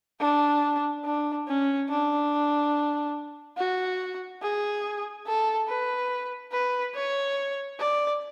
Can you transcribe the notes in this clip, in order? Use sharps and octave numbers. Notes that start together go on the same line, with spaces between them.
D4
D4
C#4
D4
F#4
G#4
A4
B4
B4
C#5
D5